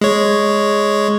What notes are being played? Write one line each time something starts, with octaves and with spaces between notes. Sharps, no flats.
G#3 C#5